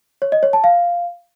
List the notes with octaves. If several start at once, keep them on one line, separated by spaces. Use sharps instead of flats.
C#5
D#5
C#5
A5
F5